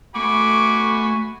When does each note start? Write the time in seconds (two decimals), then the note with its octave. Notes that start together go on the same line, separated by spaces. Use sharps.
0.15 A3 F#4 G#5 B5 C#6 D6